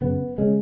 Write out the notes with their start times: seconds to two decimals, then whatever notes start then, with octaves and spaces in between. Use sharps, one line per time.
0.01 F#2 C#3 B3
0.38 C#3 G#3